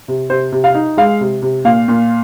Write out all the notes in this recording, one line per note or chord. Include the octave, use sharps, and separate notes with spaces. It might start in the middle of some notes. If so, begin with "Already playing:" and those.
C3
C3 C5
C3
F5
D#4
G#3 F5
C3
C3
A#2 F5
A#2